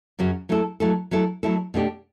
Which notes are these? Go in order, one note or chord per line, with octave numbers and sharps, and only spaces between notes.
F#2 C#3 F#3 C#4 F#4
F#3 A3 E4 A4
F#3 A3 E4 A4
F#3 A3 E4 A4
F#3 A3 E4 A4
B2 A3 D4 G4